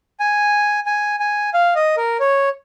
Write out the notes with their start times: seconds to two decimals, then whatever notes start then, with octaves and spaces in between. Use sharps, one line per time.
0.20 G#5
0.86 G#5
1.20 G#5
1.54 F5
1.75 D#5
1.97 A#4
2.20 C#5